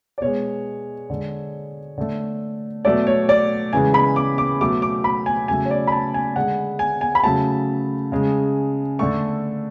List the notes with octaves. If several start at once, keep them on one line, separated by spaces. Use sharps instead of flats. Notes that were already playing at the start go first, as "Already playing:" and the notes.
D5
B2 G#3 C#5
D3 G#3
D3 A3
B2 F#3 A3 D5
C#5
D5
C#3 E3 G#3 G#5
B5
D6
D6
B2 F#3 A3 D6
D6
B5
G#5
C#3 F#3 A3 G#5
C#5
D5
B5
A5
G#5
D3 G#3 F#5
G#5
G#5
B5
C#3 F#3 A3 A5
C#3 G#3
D3 A3 C#6